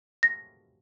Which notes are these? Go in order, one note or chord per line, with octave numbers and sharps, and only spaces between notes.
A#6